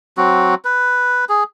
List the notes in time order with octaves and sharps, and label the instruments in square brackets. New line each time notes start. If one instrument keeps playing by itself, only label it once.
[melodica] F#3 C4 F#4
B4
G#4